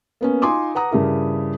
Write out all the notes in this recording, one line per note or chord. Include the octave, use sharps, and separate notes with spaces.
A#3 B3 C#4
D#4 F4 G#5 C6 D6 D#6
B4 F#5 A#5 D#6
G2 C#3 E4 A#4